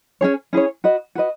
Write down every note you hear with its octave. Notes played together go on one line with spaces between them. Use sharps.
C#4 E4 G#4 C#5
C#4 E4 G#4 C#5
F#4 B4 D#5
F#4 B4 D#5